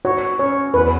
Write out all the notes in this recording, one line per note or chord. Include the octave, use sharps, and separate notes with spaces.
F#4 C#5
C#4 C#5
E2 B4